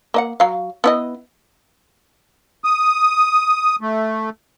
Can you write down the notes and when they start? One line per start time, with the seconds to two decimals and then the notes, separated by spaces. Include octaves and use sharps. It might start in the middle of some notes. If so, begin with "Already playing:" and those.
0.14 A#3 D#5 F#5
0.40 F#3 F5
0.84 B3 E4 D#5
2.64 D#6
3.81 A3